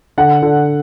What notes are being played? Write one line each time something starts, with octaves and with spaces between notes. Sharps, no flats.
D3 F#5
D3